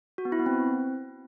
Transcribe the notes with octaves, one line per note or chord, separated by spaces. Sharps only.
F#4
B3
E4
B3
C4